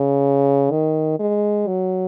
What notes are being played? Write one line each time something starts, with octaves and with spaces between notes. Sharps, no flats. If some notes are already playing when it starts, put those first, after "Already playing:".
Already playing: C#3
D#3
G#3
F#3